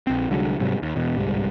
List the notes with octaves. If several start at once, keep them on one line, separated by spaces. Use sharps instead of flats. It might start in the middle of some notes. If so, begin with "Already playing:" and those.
A#1 C4
C2 D3 F#3 G#3
G#2 C3 F#3 G3
D#2
E2 B2
G1 C2 G#2 G3